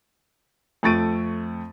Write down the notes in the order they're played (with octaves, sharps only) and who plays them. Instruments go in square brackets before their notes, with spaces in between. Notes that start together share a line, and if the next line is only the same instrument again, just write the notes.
[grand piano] F2 A3 C#6 A6 D7 D#7